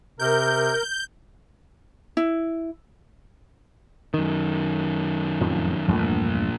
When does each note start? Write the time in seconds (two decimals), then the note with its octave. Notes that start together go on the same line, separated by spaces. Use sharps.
0.19 C3 A#4 G6
2.17 E4
4.14 F#2 D#3
5.41 F2 A2 F3
5.88 A#1 E2 G2 A#2 A3